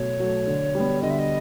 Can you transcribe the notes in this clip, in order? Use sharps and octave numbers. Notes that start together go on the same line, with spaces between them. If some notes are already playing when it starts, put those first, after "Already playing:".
Already playing: B2 F#3 A3 C#5
F#3 A3
D3
G3 B3
D3 D#5
E5
D#5